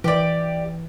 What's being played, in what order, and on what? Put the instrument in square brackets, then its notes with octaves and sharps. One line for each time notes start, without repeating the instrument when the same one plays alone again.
[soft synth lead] E3 [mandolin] G4 D5